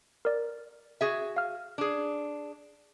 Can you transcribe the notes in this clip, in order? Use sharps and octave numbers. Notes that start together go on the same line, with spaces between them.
A#4 D5
F#4 G#4 E5
F5 F6
D4 G#4